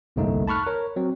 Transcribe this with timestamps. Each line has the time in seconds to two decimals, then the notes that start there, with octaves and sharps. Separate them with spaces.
0.16 G1 C2 F2 A3 A#3 D#4
0.47 A5 B5 C#6 F6 F#6
0.67 A#4 C#5
0.96 F#3 C4